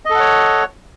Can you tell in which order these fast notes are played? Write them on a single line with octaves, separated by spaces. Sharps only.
D#5 A4 F#5 C#5